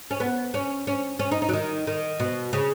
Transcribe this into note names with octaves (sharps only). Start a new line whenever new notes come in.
C#4
B3
C#4
C#4
C#4
D#4
D#4
F#3
D#3
D#3
B2
C#3